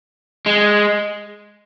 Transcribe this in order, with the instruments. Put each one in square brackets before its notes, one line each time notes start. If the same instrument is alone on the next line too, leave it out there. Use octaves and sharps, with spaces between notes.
[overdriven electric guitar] G#3